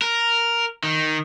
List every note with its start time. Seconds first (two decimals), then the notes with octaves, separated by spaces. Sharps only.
0.02 A#4
0.83 D#3